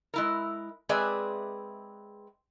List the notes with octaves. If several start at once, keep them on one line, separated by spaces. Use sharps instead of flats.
G#3 E4 A#4
G#3 C4 G#4 B4 D5 E5